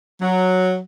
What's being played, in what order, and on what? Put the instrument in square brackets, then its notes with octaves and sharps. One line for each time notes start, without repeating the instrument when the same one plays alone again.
[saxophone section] F#3